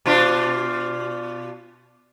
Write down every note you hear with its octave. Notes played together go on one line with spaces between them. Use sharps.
B2 D4 F4